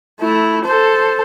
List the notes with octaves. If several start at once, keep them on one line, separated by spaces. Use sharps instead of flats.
A3 E4
A4 C5